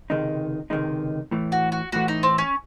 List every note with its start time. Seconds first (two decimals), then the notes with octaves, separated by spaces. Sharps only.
0.10 C#2 C3 D#3 G#3 D#4
0.70 C#2 C3 D#3 G#3 D#4
1.31 A2 E3 A3
1.52 F#4
1.72 F#4
1.92 A2 E3 A3 F#4
2.08 D#4
2.23 C4
2.38 C#4